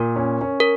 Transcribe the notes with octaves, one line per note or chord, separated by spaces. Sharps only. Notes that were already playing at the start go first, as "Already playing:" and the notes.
Already playing: A#2 A#4
C#4
C#4
A#4